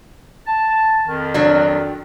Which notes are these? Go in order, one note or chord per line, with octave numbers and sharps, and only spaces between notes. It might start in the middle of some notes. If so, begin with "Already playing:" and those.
A5
F2 D#3
F#3 D4